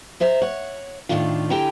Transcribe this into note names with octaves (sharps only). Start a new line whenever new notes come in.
G#3 C5 E5 A#5
C#5 F#5
A2 D#3 G3 A3 D4 F4
D3 E4 G4 G5 G#5 A#5